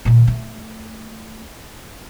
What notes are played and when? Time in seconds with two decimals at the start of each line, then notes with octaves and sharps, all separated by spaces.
0.05 A#2 D#3
0.27 A3